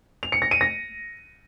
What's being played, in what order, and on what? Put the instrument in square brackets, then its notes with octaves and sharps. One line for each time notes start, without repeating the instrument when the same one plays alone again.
[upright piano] F7
C#7
A#6
D#7
A#6